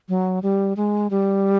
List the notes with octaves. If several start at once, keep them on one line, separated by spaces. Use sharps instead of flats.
F#3
G3
G#3
G3